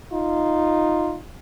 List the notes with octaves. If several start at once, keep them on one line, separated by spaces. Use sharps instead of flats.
D#4 F4